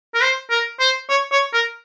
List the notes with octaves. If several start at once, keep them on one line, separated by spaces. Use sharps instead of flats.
A#4
C5
A#4
C5
C#5
C#5
A#4